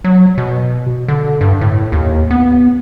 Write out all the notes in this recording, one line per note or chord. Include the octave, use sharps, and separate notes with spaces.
F#3
B2
D3
G2
A2
D#2
B3